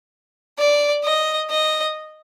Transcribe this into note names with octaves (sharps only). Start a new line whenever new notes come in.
D5
D#5
D#5